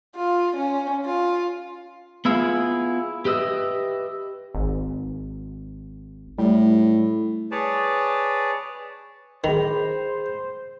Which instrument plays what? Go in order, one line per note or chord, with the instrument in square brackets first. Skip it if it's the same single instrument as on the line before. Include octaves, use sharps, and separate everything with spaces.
[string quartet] F4
C#4
F4
[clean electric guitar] B3 E4 F4 G#4
G4 B4 D#5 E5
[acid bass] G#1
[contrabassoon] A2 [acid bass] G3
[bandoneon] G#4 B4 C#5 D5 A5
[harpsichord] D#3 [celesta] G#4 B5 F7 [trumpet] C5